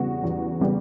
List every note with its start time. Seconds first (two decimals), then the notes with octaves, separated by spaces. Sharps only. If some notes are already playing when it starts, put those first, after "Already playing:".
Already playing: E2 C#3 G3 B3 F#4
0.24 E2
0.60 C#3 G3 B3